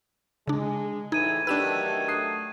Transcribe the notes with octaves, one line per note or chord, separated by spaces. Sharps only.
C#3 G#3 D4
D2 A2 E3 D#4 G#6 D#7
D#3 F#3 A3 D4 G4 B4 E6 E7
D#6 F#6 C7